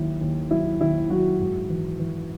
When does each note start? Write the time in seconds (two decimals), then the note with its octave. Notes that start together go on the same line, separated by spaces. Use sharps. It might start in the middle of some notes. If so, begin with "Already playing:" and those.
Already playing: D#2 F#3 E4
0.21 D#2
0.51 F#3 E4
0.81 D#2 E4
1.10 F#3 F#4
1.40 G#2
1.70 E3
1.99 E3